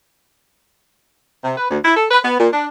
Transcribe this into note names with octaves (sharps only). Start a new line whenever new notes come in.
C3
B4
D2
E4
A4
B4
B3
A#2
D4